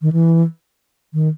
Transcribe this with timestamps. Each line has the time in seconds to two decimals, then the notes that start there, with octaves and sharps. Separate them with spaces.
0.02 D#3
0.13 E3
1.13 D#3